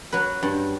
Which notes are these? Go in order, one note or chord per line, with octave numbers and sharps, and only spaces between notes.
F#3 B4
G2